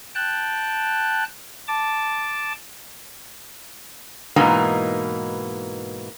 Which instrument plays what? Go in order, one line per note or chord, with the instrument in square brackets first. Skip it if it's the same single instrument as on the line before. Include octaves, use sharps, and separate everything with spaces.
[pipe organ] G5 A5 F#6
A5 D6
[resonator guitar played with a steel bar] G#2 B2 E3 A#3 D#4 G#5